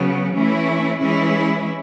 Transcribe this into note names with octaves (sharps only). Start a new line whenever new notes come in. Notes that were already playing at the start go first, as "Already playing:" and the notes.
Already playing: C#3 F#3 B3
E3 A3 C#4 E4
E3 G#3 C#4 E4